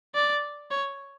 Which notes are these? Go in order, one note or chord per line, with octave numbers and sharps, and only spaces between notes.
D5
C#5